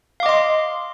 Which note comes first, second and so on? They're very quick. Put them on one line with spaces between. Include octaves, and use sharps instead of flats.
F5 D6 D#5 C6